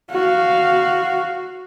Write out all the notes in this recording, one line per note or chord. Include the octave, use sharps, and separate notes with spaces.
F#4 F5